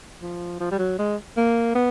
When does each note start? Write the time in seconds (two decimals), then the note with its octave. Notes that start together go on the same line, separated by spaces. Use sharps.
0.21 F3
0.60 F3
0.71 G3
0.78 F#3
0.99 G#3
1.37 A#3
1.75 B3